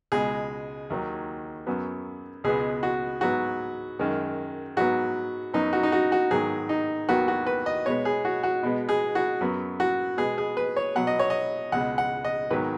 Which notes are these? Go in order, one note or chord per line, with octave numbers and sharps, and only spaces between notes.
C#2 B2 G#3 G#4
D#2 D#3 F#3
F#2 F#3 B3
C#2 B2 G#3 B3 G#4
F#4
G#2 F#3 B3 F#4
F#2 D#3 G#3
G#2 F#3 B3 F#4
F#2 F#3 B3 D#4
F#4
D#4
F#4
F#4
G#2 D#3 F#3 B3 G#4
D#4
D#2 D#3 F#3 B3 F#4
F#4
B4
D#5
B2 G#3 B3 C#5
G#4
F#4
F#4
B2 G#3 B3
G#4
F#4
F#2 F#3 B3
F#4
B2 G#3 B3 G#4
G#4
B4
C#5
B2 F#3 B3 F#5
D#5
C#5
D#5
C#2 B2 G#3 F#5
F#5
D#5
G#2 D#3 F#3 B3 B4